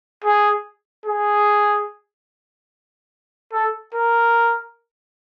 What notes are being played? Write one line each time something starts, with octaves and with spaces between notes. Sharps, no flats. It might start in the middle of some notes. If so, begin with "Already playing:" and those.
G#4
G#4
A4
A#4